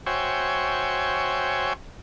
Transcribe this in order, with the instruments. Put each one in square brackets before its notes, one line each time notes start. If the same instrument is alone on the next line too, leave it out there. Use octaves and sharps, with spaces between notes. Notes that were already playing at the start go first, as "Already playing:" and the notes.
[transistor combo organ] F#4 C5 C#5 E5 G5 G#5